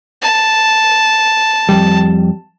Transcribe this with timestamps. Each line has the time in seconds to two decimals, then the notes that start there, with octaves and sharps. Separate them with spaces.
0.22 A5
1.69 F2 G3